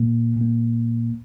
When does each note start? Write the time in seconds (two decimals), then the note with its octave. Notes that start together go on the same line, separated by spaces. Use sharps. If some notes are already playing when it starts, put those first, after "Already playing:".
Already playing: A#2 A#3
0.37 A#2 A#3